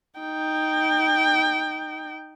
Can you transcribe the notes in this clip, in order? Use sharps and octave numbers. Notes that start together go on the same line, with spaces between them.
D#4 G5